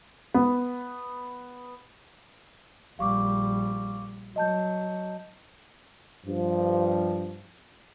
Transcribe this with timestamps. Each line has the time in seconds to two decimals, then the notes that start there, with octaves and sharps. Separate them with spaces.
0.34 B3
2.99 A#1 G3 F5 C#6 D6
4.36 F#3 D#5 A5 G6
6.26 G2 F3